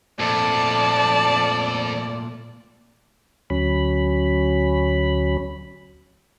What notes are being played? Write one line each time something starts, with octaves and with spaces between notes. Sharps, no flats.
F2 A#2 A3 D5 A5
D2 F#3 C#4 B5